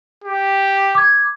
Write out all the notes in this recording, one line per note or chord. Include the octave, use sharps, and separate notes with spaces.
G4
D6 G#6